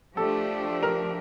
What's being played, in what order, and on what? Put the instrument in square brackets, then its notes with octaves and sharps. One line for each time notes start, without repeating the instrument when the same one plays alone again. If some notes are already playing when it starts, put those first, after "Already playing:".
[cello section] F3 A3 D4 G4 [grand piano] A4
[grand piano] A#4